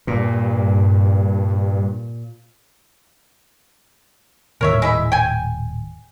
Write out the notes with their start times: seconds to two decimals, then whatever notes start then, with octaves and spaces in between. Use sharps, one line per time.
0.07 G2 A#2
4.61 D#1 A2 D#3 A#4 C#5 E5
4.82 G#3 E4 E5
5.12 G5 G#5